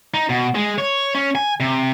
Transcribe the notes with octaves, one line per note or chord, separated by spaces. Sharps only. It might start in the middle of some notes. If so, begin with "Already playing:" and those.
D#4
B2
G#3
C#5
C#4
G#5
C3